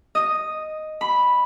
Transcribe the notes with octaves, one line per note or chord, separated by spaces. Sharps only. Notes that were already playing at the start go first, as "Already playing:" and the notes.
D#5
B5